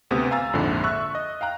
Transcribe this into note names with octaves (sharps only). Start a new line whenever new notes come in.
D2 C3 B3 D#6
F5 G#5 A#5 E6 A6
A#1 F2 G#2 D3
E5 C#6 E6 F#6
D#5
F5 G5 A#5 F#6